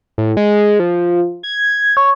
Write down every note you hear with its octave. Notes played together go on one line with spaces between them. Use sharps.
A2
G#3
F3
G#6
C#5